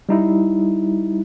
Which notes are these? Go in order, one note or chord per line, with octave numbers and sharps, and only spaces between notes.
G3 D#4 E4